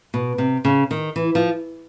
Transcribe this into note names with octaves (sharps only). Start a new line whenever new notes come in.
B2
C3
C#3
D#3
E3
F3